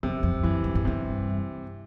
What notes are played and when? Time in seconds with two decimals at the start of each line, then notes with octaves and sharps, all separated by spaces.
0.03 F2 C3
0.23 F2
0.43 F#2 E3
0.64 G2
0.75 G#2
0.85 G2 C3